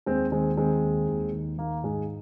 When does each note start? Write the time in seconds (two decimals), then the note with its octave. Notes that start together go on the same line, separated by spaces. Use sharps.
0.06 D#2 G#3 C4
0.32 D#3 G#3 C4
0.58 D#3 G#3 C4
0.83 D#2
1.08 D#2
1.33 D#3
1.58 D#3 A#3
1.83 G#2 G#3